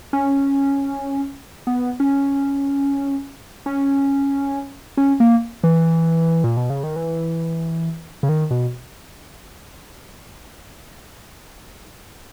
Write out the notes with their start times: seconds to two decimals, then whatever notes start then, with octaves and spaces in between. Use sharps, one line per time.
0.13 C#4
1.67 B3
2.00 C#4
3.66 C#4
4.97 C#4
5.20 A#3
5.64 E3
6.44 A#2
6.57 B2
6.70 C#3
6.84 D#3
6.96 E3
8.23 C#3
8.29 D#3
8.51 B2